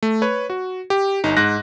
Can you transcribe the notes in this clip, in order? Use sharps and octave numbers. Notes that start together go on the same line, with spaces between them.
A3
B4 C#5
F#4
G4
G1 D#4
G#2 F#6 A#6